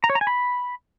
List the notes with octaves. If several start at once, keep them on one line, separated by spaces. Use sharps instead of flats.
A#5
C#5
A#5
G#5
B5